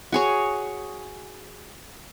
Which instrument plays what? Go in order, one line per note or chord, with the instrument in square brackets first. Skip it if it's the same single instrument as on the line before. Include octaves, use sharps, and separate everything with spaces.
[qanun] F#4 G#4 C#5